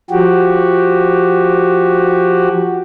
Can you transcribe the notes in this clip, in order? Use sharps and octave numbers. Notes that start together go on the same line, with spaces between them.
F3 F#4 G4